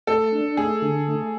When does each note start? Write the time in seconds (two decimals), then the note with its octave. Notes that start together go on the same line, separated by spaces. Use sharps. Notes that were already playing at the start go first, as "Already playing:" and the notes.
0.07 A3 A4
0.32 D4
0.57 A3 G#4
0.82 D3
1.08 A3